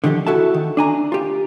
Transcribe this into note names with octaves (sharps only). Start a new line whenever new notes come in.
D3 D#3 F3 G4 A4
E4 F#4 A4 E5 A5
D#3
D4 G#5 A#5
F4 G4